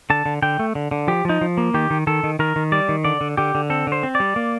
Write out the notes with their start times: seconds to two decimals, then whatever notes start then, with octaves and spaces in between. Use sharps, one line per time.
0.10 D3 A5
0.26 D3
0.42 D3 G5
0.59 A3
0.75 D3
0.91 D3
1.08 F3 G4
1.25 F3 D#4
1.41 F3
1.58 A#3
1.74 D#3 G4
1.90 D#3
2.07 D#3 A4
2.24 D#3
2.39 D#3 A#4
2.56 D#3
2.72 G3 D5
2.89 D#3
3.04 D3 D5
3.21 D3
3.37 D3 G4
3.55 D3
3.70 C4 A4
3.87 D3
3.92 C5
4.03 C4
4.15 D5
4.20 G3
4.36 A#3